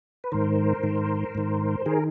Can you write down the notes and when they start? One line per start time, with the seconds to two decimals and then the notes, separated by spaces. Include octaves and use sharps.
0.24 B4
0.32 G#2 D#3 A#4 C5
0.83 G#2 D#3
1.35 G#2 D#3
1.86 D#3 G#4 A#4